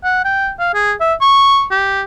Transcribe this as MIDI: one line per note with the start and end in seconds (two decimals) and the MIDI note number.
0.04 0.20 78
0.25 0.51 79
0.59 0.73 77
0.74 0.93 68
1.00 1.14 76
1.21 1.65 85
1.71 2.02 67